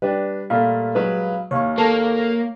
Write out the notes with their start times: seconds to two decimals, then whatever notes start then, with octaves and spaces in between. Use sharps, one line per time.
0.02 G3 D4 B4
0.50 A#2 A3 F5 B5
0.95 F#3 G#3 B4
1.51 D#2 C#5 F5 C#6
1.78 A#3 A4